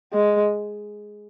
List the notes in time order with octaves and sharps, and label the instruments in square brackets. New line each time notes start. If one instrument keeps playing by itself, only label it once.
[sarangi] G#3